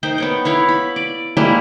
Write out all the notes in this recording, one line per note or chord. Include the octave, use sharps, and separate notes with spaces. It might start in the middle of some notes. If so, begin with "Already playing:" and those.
D#4 A#4 C5 G5
B3 C#5 G5
E4 C#5 F5
B5
D5
G3 G#3 A#3 E4